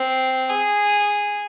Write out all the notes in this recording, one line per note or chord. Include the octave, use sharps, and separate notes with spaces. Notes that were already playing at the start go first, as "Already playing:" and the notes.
Already playing: C4
G#4